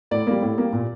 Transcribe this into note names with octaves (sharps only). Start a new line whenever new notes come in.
A2 D5
G3 A#3
A2
G3 A#3
A#2